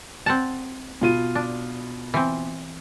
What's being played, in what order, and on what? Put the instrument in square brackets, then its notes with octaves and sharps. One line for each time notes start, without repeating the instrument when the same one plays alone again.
[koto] C4 F#5 A5
[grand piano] B2 F4 D#7
[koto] D4
E3 C4